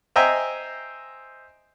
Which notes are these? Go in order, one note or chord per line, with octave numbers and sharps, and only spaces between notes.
C5 D#5 E5 G5 G#5 A#5